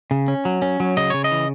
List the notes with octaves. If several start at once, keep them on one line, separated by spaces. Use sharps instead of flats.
C#3
C#4
F#3
C#4
F#3
C#3 D#5
C#3 C#5
D#5
E3